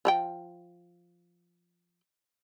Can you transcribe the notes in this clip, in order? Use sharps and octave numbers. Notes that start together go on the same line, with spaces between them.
F3 E5 G5